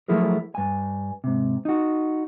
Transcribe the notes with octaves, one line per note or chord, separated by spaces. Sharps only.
F3 F#3 A3 E4 G#4 A#4
G2 G#5
G#2 C3
D#4 F#4